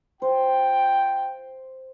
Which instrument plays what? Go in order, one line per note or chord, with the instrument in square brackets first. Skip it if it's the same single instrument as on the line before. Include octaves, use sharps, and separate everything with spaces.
[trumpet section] F4 G5 [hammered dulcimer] C5